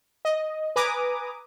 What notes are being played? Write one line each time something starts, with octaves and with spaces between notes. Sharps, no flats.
D#5
B4 G#5 A#5 D6 D#6